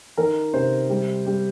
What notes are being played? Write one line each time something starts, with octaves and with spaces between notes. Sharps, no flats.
D#3 A#4
C3 C5
G3
G3